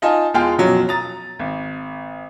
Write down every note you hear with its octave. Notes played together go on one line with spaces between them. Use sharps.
D#4 F4 D#5 G#5 A5
E2 G#3 F4 F5 G5
F#2 B2 F3 F#3
A#5 D#6 A6
G#1